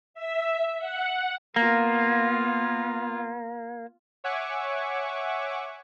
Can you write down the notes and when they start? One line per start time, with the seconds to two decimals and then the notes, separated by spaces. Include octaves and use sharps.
0.14 E5
0.79 F#5
1.56 A#3 B3 F4
4.24 C#5 E5 F#5 G#5 C#6 D6